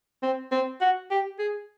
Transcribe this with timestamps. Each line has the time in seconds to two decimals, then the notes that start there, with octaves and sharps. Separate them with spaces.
0.23 C4
0.52 C4
0.81 F#4
1.11 G4
1.39 G#4